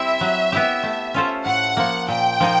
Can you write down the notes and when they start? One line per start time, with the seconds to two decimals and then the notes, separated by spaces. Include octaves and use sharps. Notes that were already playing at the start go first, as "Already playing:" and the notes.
Already playing: G3 C4 E4 E5
0.21 F#3
0.52 B3 E4 G4
0.83 A3
1.14 C#4 F4 A4 C5
1.45 A2 F#5
1.77 F3 A#3
2.08 A#2 G5
2.40 F3 A#3 D#4